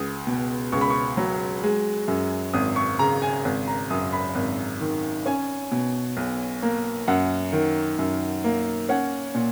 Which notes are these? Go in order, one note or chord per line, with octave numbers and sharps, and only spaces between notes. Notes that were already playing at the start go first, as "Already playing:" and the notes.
Already playing: C#2 D#6
B2
C#2 C#6
B5
C#6
F#3
G#3
F#2
G#1 D#6
C#6
C#3 A#5
G#5
G#1
A#5
F#2 D#6
B5
G#1
D#3
C#4 G#5
B2
B1
A#3
F#2 F#5
D#3
F#2
A#3
C#4 F#5
A#2